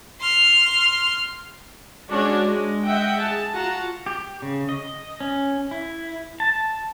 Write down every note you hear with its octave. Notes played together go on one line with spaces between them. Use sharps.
C6 F6
G#3 C#4 D4 F#4 C#5 D5
G#3
D#5 E5 F#5 G5
G#4 A5
F4 F#4 F#5 A5 A#5
G4
C#3
D#5
C#4
E4
A5